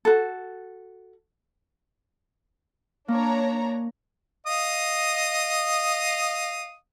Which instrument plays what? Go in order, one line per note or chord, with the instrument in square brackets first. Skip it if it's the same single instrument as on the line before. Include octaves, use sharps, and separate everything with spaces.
[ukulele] F#4 A4
[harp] A#3 [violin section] D4 C#5 A#5
[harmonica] D#5 F5 D#6